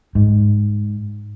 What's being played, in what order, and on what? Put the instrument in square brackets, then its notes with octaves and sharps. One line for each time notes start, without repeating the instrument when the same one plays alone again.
[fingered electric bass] G#2